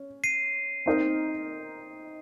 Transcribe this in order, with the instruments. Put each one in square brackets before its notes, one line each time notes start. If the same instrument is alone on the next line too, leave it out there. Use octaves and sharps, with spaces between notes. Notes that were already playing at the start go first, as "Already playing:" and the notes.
Already playing: [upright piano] C#4
[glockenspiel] C7 D#7
[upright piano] C4 D#4 A#4 D#5